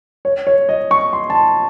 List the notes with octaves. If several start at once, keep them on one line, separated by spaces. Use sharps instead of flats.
C#5
C#5
D#5
C#6
C6
A5
C6